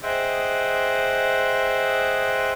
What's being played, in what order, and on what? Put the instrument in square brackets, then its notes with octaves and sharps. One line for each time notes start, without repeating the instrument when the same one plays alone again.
[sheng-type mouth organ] G#4 C5 D#5 E5 F#5 G5